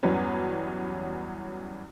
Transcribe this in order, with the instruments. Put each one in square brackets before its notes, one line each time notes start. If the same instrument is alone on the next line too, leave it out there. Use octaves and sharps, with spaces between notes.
[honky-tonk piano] E2 G2 E3 F#3 B3 C#4